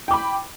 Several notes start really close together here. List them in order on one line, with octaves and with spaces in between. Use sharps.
G5 D6 B5